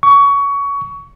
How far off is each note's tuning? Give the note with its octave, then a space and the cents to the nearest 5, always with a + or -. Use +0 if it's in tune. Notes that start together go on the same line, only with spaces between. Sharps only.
C#6 +20